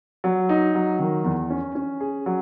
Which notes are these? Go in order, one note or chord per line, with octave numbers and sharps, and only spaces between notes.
F#3
D#4
F#3
D#3
E2
C#4
C#4
G#4
F#3